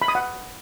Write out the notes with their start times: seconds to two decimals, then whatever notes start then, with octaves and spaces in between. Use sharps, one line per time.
0.02 B5
0.08 D#6
0.15 F#5